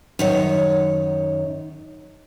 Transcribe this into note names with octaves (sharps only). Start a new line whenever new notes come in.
F#2 D#3 C#5